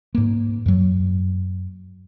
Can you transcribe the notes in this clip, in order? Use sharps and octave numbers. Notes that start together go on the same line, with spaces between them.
G#2 A#3
F#2 F#3